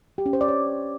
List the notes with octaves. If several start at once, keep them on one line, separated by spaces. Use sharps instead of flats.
G4
C#4
C5
D5
C#5